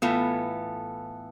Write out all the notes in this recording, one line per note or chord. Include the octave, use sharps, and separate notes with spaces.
A2 E3 B3 F4 A4